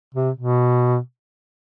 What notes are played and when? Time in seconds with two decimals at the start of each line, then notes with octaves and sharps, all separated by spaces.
0.15 C3
0.37 B2